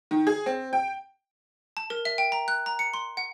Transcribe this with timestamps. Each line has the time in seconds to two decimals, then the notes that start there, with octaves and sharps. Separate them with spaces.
0.11 D#3
0.27 G#4
0.46 C4
0.73 G5
1.77 A5
1.90 A#4
2.05 E5
2.18 G5
2.32 A#5
2.48 F#6
2.66 A#5
2.79 C#7
2.94 C6
3.17 F#5